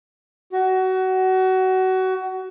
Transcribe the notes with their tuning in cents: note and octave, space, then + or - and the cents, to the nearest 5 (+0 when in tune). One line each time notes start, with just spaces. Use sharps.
F#4 +25